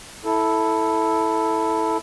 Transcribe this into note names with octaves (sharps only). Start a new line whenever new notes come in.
E4 A4